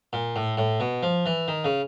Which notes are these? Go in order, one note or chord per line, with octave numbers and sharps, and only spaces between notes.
A#2
A2
A2
B2
F3
E3
D#3
C#3